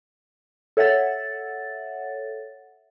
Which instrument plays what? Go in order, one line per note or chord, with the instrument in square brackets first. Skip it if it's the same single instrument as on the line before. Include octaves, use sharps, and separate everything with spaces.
[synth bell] A4 C#5 E5 F#5 A6